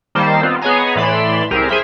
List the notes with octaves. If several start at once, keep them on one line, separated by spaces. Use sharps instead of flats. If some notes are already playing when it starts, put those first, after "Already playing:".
D#3 G3 A#3 C5 A5 E6
B3 C4 F4
B3 G#4 C#5 D#5 G#5 A#5
A2 E3 D5 B5 C6 E7
C2 C4 G4 G#4 A#4 E7
G#4 C5 E5 B5 F6